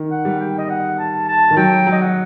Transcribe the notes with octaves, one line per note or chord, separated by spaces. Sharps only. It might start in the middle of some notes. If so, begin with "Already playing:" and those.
Already playing: D#3
F#5
G3
G5
D#5
F#5
A5
A5
D#3
F#3 G5
F#3
D#5
F#5